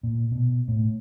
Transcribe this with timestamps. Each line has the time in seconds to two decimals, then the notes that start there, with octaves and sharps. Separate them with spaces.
0.03 A#2
0.32 B2
0.68 A2